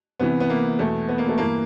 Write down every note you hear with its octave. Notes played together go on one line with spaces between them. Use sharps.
C2 C3 E3 B3
B3
A#3
E2 B2 A3
B3
A#3
A3
G2 E3 A#3